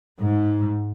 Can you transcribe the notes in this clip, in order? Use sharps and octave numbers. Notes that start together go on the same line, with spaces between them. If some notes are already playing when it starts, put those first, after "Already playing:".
G#2